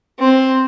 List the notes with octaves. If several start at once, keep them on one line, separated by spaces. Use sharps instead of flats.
C4